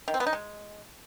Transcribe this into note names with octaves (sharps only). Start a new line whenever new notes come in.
D#3
C4
B3
D#4
G#3